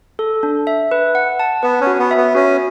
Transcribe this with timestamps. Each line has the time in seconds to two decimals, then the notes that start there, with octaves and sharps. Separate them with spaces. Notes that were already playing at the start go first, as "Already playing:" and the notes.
0.19 A4
0.43 D4
0.67 E5
0.91 B4
1.15 F#5
1.39 A5
1.63 B3 B4
1.81 C#4
1.87 F#4
1.99 B3
2.11 E5
2.17 B3
2.35 C#4 F#4